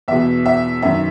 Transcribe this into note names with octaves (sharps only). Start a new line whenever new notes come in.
E2 B2 E5
E5
F#2 D#3 E5